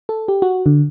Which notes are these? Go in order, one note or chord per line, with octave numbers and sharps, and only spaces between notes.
A4
G4
F#4
D3